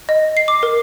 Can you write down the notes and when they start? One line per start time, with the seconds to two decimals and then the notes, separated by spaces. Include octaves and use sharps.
0.09 D#5
0.37 C7
0.48 D6
0.63 A#4